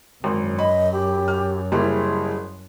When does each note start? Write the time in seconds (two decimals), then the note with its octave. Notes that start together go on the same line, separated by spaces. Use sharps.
0.24 G#1 F#2
0.59 D#5 B5
0.92 G4
1.28 F6
1.72 F#1 G3 E4 G#4